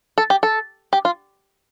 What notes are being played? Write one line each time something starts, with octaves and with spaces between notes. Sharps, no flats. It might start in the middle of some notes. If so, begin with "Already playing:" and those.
A4
G4
A4
G4
F4